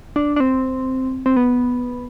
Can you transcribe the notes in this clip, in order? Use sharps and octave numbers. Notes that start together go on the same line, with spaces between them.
D4
D4
C4
C4
B3